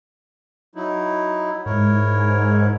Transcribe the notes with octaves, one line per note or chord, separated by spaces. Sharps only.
F#3 D#4 E4
G#2 E4 A#4 C#5